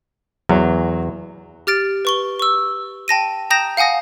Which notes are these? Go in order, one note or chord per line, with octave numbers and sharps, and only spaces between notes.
E2 F#3
G4 F6 A6 D7
B4 C#6 G7
C#6 E6
G5 A5 A#6 D#7
G5 A#5 D#6 G6 A#6 E7
F5 F#5 G#5 D#6 A#6